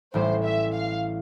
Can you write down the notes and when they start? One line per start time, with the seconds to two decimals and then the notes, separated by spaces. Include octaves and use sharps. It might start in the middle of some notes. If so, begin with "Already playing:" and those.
0.14 A1 A2 G3 C5
0.44 E5
0.74 F5